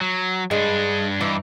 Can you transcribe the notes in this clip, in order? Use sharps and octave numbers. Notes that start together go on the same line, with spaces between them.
F#3
G2 G#3 D4
G2 E3 D4 D#4